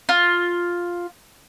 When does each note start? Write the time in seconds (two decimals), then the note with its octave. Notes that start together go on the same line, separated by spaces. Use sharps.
0.09 F4